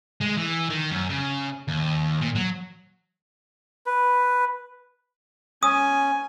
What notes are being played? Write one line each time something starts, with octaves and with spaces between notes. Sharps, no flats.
G#3
E3
D#3
F#2
C#3
D#2
A#2
F#3
B4
C#4 G#5 D#6